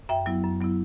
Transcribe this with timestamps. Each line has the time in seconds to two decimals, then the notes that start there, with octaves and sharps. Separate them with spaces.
0.09 F#2 E5 G5
0.26 F#3 B3 E4
0.43 F#2
0.60 F#3 B3 E4